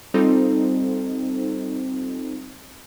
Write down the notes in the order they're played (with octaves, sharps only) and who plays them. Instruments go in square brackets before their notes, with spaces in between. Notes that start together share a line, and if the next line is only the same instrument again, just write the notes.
[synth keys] G3 C4 D#4 F4 A4 C5